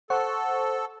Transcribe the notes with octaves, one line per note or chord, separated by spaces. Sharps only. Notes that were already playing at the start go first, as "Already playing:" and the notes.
A4 C5 F#5 C#6